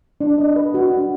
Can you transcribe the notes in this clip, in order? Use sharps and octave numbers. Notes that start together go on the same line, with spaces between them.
D4
D#5
B4
F#4
D4